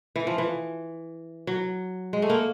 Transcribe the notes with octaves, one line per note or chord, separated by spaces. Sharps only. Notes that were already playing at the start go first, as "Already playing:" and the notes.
E3
F3
E3
F#3
G#3
A3
A#3